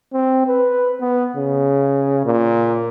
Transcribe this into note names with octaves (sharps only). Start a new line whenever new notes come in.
C4
B4
B3
C#3
A#2